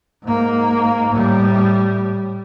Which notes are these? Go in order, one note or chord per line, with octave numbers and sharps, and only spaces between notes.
G#2 A#3
A2 G3